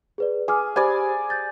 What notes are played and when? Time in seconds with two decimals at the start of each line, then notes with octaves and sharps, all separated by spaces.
0.18 G#4 B4 D5
0.48 G#4 G#5 D6 F6
0.76 G4 C5 D5 G#5 B5
1.30 G6 A6